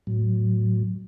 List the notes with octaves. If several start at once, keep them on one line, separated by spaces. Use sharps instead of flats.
A2 F#3